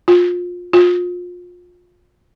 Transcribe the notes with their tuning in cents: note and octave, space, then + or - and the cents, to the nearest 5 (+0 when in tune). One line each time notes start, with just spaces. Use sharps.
F4 +25
F4 +30